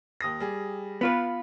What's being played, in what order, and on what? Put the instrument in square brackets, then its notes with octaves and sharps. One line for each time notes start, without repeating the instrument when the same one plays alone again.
[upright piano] D#2 D#6 A#6
G3 G#4
[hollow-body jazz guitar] B3 F4 B4 [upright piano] B5 F6